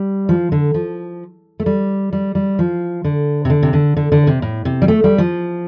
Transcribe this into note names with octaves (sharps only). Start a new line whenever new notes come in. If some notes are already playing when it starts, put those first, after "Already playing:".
Already playing: G3
F3
D3
F3
A3
G3
G3
G3
F3
D3
C3
D3
C3
D3
D3
D3
C3
A2
C3
G3
A3
G3
F3